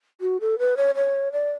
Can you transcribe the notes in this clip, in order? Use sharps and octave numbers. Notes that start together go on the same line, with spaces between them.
F#4
A4
B4
C#5
C#5
D5